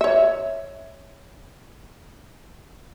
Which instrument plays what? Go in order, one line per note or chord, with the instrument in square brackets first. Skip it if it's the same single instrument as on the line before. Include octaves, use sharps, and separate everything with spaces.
[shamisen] C#5 E5